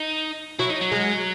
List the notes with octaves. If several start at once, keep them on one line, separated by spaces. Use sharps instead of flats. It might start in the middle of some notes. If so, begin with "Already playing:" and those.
Already playing: D#4
F#3 E4
D#4
F#3
G#3